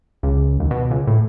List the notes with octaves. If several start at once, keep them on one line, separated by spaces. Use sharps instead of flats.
C#2
D#2
B2
C#2
A2